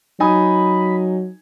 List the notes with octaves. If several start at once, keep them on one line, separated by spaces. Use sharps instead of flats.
F#3 D#4 G#5 B5 D#6